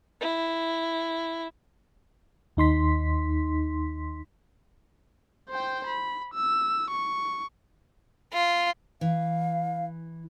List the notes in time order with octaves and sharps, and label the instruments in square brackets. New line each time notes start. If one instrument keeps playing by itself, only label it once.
[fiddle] E4
[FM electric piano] D#2 D#4 C6 B6
[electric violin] C5 G5
B5
E6
C#6
[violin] F4
[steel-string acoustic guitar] E3 [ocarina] F5